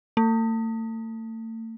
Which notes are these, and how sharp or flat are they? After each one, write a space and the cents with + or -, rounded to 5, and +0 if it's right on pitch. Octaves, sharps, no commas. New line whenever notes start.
A3 +40